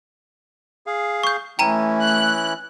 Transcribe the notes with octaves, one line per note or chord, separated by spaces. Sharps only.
G#4 F5
C#6 G6
E3 A3 C#4 E4 G5 A#5 D#7
F#6